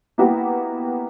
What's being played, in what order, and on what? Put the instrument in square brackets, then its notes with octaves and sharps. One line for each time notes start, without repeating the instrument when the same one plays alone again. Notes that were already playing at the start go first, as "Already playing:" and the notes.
[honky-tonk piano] A#3 B3 E4 F#4 G4